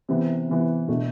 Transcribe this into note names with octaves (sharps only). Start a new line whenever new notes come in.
C3 E3 B3
C3 E3 B3
B2 A3 D4